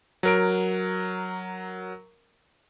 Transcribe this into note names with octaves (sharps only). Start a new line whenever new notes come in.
F#3 A#4 D7